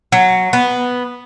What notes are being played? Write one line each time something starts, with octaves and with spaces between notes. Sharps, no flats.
F#3
B3